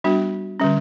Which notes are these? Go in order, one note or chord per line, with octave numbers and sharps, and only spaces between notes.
G3 B3 D4 F#4
D3 G3 C#4